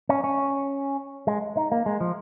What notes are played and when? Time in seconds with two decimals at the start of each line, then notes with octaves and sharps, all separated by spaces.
0.09 C#4
0.24 C#4
1.27 G#3
1.57 D#4
1.72 A#3
1.86 G#3
2.01 F3